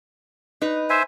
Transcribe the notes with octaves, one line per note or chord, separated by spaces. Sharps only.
D#4 B4
C5 E5 G#5